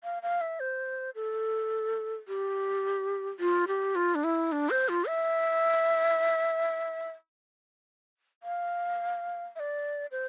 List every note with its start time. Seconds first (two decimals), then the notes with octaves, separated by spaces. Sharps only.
0.04 F5
0.22 F5
0.41 E5
0.60 C5
1.15 A4
2.28 G4
3.40 F4
3.67 G4
3.95 F4
4.15 D4
4.24 E4
4.52 D4
4.70 C5
4.89 F4
5.07 E5
8.43 F5
9.56 E5
9.59 D5
10.11 C5